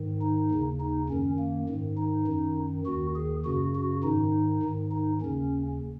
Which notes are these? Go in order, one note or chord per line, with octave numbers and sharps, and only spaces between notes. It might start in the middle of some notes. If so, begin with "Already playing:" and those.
Already playing: G#2 D#3
D#4
D#2 C#3
D#4
F#2 D#3 C#4
A#3
G#2 D#3
D#4
F#2 D#3
D#2 D#3 F#4
G#4
F#2 C#3 F#4
F#4
G#2 D#3 D#4
G#2 D#3
D#4
D#2 C#3 C#4